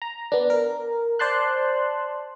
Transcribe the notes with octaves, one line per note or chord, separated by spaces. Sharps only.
A#5
B3 D4
A#4
C5 D5 A5 C6 F#6